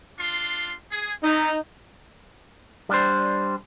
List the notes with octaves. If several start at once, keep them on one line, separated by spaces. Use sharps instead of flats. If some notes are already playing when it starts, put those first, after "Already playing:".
D4 F4 C6
G#4
C4 D#4 E4 A4
G3 D4 C5